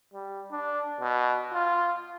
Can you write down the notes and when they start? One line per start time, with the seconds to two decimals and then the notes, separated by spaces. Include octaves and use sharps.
0.14 G3
0.51 D4
1.01 B2
1.53 F4